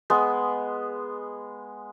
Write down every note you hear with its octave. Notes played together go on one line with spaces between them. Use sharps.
G#3 B3